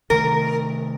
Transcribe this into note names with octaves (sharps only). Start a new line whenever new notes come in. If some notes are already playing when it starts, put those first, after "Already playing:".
C3 D#3 A3 A#4